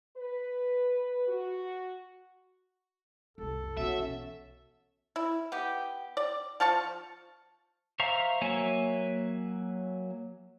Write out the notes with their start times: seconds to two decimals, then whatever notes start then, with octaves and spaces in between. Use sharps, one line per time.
0.17 B4
1.28 F#4
3.38 C2 F#2 A4
3.77 B1 E3 C#4 F#4 E5
5.16 E4
5.52 B3 G4
6.17 D5
6.60 F3 F5 A5 C#6
8.00 C5 E5 F5 A#5 C#6
8.41 F#3 A#3 C#5 E5 G#5